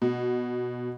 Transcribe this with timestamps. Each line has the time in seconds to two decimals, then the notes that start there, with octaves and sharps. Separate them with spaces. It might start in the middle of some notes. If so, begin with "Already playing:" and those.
0.02 B2